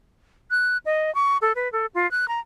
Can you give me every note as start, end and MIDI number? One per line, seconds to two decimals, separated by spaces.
0.51 0.77 90
0.86 1.13 75
1.15 1.37 85
1.42 1.53 69
1.56 1.71 71
1.73 1.86 69
1.95 2.09 65
2.11 2.28 90
2.28 2.40 82